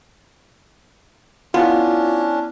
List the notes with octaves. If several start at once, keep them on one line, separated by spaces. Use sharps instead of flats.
B3 C#4 D4 E4 F4